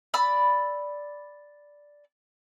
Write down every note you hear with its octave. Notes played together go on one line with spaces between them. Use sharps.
D5 B5 E6